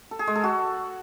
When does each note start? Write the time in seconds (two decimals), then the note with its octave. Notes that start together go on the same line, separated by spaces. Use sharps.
0.11 A4
0.19 G#4
0.27 G#3
0.35 A4
0.44 F#4